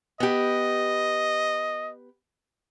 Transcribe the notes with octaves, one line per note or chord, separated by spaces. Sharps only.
B3 G4 D#5